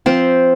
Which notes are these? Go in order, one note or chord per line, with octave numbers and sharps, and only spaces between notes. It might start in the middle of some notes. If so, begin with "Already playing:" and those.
F3 C4 C5